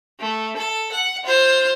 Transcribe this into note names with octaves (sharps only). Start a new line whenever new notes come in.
A3
A4
F#5
F4 C5